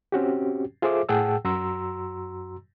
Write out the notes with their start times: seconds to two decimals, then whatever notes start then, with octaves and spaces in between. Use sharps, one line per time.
0.12 C4 C#4 F#4 G4
0.82 F4 G#4 A4 C5 E5 D6
1.09 A2 G#4 F#5 G5 A5 E6
1.45 F#2 F#4 A#5 C6 E6